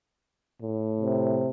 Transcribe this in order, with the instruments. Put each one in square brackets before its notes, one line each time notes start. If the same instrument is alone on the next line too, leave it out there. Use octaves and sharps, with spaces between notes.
[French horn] A2
[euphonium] C3